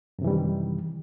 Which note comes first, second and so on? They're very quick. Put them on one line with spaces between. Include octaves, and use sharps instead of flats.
F#2 C3 E3 G3 D#3